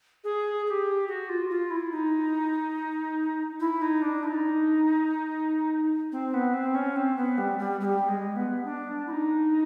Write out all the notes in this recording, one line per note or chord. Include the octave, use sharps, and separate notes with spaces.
G#4
G#4
G4
F#4
F4
F4
E4
D#4
E4
D#4
D4
E4
D#4
C4
B3
C4
C#4
C4
B3
G3
G3
G#3
G3
G#3
B3
D4
E4
D#4